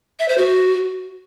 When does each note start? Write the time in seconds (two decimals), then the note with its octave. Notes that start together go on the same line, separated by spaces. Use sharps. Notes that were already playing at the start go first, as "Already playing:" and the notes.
0.19 E5
0.28 C5
0.38 F#4